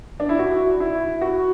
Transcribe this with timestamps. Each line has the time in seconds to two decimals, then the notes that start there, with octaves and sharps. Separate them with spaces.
0.20 D4
0.29 E4
0.39 F#4
0.80 E4
1.21 F#4